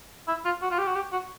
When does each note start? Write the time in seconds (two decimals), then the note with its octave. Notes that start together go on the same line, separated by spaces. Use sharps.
0.28 E4
0.45 F4
0.62 F#4
0.71 F4
0.79 G4
0.87 F#4
0.95 G4
1.12 F#4